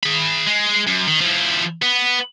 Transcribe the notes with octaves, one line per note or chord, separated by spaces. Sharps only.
G#4 B5
G#3
F#2
D#3
F3 E4
B3